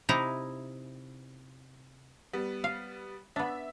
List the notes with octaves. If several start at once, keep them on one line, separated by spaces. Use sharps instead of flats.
C3 D#4 E4 A#5
G3 B3
F5
B3 D4 E5